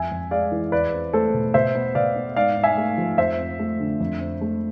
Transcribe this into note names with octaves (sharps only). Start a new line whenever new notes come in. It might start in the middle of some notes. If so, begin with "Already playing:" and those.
Already playing: F2 E5 G#5
F2
G#3 D5 F5
E3
E2 B4 D5
C4
A3 A4 C5
B2
B2 C5 E5
B3
B2 D5 F5
B3
G#2 D5 F5
G#2
E5 G#5
A3
F3
F2 C5 E5
C4
A3
D3
F2
C4
A3